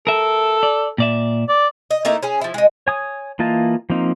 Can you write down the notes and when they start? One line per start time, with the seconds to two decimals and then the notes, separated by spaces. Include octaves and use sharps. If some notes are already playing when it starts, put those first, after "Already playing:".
0.07 A4 A#4 E5
0.63 D5
0.98 A#2 D5 E5
1.49 D5
1.91 D#5
2.05 A3 A#3 D#4 E4
2.23 C#4 G#4
2.41 F3 E4
2.54 G#3 D#4
2.87 C#5 G#5 D#6
3.39 E3 A#3 F4 D#5 A5
3.90 F3 A#3 C4 D#4